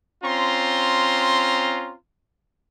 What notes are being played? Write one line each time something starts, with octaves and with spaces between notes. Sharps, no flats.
C4 C#4 F4 A#5 C6